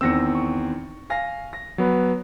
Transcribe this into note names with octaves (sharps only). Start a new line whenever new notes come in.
E2 D#3 C4 E6 A#6 C#7
C#6
F5 G#5 A#6
A#6
F#3 B3 B4